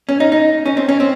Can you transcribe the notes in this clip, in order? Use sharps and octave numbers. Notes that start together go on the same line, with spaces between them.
C#4
D#4
D#4
C#4
C4
C#4
C4